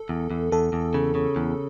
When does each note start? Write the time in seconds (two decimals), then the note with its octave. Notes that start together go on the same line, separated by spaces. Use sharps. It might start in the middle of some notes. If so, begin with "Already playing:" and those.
Already playing: A4
0.09 E2
0.31 E2
0.52 E2 A4
0.73 E2
0.94 C#3
1.15 C#3
1.36 E2